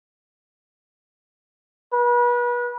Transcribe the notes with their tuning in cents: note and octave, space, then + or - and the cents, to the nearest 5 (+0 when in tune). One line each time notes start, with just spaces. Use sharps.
B4 -35